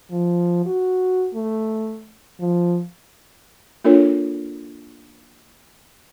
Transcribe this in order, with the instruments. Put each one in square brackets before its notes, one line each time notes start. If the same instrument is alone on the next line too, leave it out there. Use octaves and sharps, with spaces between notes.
[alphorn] F3
F#4
A3
F3
[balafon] A#3 D4 F4 A4 A#4 C#5